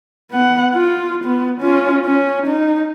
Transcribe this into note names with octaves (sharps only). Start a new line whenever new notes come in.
B3 F#5
F4
B3
C#4 F4
C#4
D#4